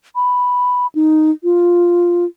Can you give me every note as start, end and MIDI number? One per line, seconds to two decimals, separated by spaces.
0.15 0.87 83
0.95 1.31 63
1.44 2.25 65